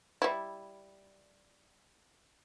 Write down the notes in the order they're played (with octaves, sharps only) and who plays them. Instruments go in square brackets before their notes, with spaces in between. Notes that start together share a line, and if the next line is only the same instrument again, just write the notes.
[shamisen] G3 E4